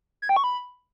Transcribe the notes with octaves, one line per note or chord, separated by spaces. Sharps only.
G#6
G5
C#6
B5